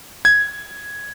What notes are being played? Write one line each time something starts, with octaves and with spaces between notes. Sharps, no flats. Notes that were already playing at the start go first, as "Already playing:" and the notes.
G#6